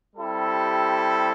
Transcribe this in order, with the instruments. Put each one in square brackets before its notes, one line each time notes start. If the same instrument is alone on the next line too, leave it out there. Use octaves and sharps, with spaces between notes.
[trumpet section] G3 C4 E4 G4 A4